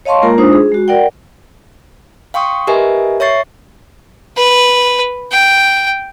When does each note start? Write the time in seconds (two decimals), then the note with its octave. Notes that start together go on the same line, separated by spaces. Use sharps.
0.05 C#5 D#5 F5 A5 C6 C#6
0.22 G#3 A#3 F4 A#4 A#5
0.38 G#3 D4 D#4 F4 C5 D#6
0.53 G#4
0.72 G#3 F#4
0.88 A#4 D5 F#5 G5
2.34 F5 G5 C6 C#6 D#6
2.67 G4 A#4 B4 D#5 E5 G#5
3.20 C#5 E5 C#6 A6 C7
4.37 B4
5.32 G5